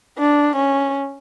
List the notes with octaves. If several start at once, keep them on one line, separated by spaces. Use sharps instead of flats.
D4
C#4